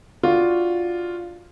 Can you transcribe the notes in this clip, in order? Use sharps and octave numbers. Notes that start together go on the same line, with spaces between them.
D4 F4 F#4 D5